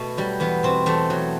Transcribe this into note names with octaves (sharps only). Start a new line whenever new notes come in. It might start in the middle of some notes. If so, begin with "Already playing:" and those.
Already playing: B2 A3
F#3 G3
E2 B3
B2 C4
E2 A3
F#3